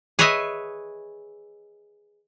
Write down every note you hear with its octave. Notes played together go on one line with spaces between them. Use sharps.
G#4 B4 C#5 D#5 E5 G#5